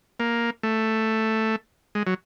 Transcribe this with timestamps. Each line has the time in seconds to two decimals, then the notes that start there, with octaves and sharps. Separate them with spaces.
0.20 A#3
0.63 A3
1.95 G#3
2.07 F#3